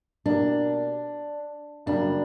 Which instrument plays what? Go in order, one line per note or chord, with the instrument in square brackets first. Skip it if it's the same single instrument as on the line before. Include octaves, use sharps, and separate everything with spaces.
[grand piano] B2 A#3 E4 G4 A#4 [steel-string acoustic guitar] D4
[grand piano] F#2 C#3 G3 A#3 [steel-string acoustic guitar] D4